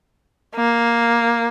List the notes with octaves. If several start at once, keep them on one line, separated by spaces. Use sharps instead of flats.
A#3